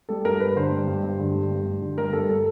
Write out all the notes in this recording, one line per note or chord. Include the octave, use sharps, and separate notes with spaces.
G3 A4
G2 A#4
G2 B4
D3 C5
G3
G2
G2
D3
G3
G2
G2
D3
G3 A#4
G2 A4
A4